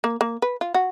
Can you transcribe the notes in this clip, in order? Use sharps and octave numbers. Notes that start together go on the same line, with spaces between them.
A#3
A#3
B4
F4
F#4